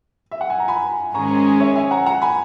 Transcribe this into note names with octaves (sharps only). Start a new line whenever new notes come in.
E5
F#5
G#5
A#5
G#5 B5
G#2 D#3 G#3 C#4 G#4 A#5 C#6
C#5 E5
E5 G#5
F#5 A#5
F#5 A#5
G#5 B5